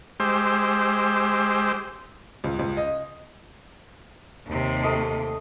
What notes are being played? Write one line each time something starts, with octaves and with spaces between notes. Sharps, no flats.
G#3 G4 C5 E6
C#2
C#2
D#5
D#2 C3
A3 D#5